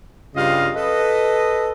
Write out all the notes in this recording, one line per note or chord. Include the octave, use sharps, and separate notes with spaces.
G2 C#3 G3 F4 D#5 F5
A4 B4 D#5